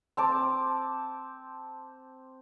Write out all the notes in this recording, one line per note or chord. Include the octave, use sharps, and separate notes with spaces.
C4 A5 D6